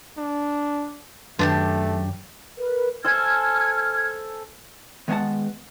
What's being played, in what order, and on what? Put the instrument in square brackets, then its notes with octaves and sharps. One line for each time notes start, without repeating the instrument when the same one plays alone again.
[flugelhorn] D4
[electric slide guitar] F#2 [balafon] D#3 [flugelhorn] A3 [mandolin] D4 F#4 G4
[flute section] A#4 B4
[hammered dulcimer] A4 C5 G#5 [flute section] F6 G#6
[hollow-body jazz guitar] D#3 G#3 B3 C#5 F#5 A5